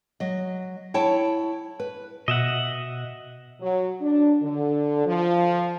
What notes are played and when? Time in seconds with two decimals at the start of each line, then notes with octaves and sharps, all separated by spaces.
0.20 F#3 D#5
0.94 E4 C#5 G5 A5
1.80 B4
2.28 B2 D#5 E5 F#5
3.61 F#3
4.00 D4
4.41 D3
5.06 F3